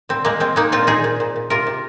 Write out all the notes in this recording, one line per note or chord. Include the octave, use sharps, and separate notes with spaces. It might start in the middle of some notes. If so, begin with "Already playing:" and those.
A#2 C4
G#3 A#3
G#3 C4
G#3 A#3 D#4
A#2 C4 F4
A#2 D#4 G#4
A#2
A#2
A#2
C3 F4 A#4
C3